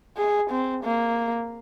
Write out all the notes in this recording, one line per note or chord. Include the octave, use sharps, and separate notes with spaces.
G#4
C4
A#3